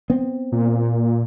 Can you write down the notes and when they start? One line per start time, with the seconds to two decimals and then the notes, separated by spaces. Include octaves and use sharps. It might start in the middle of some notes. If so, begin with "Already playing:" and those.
0.10 B3 C4
0.52 A#2